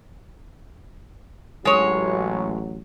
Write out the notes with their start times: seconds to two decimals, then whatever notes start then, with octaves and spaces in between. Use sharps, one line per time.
1.65 A1 F#3 G#3 C#5